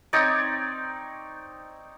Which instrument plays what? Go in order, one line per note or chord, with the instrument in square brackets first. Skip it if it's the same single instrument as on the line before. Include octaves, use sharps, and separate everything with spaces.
[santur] C4 D#4 C#5 D5